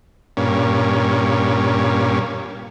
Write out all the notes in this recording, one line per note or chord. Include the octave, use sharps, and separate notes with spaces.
G2 A#2 C#4